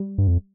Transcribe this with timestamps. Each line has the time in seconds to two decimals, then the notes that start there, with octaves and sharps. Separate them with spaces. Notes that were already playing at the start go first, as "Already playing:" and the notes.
Already playing: G3
0.18 G2
0.27 F2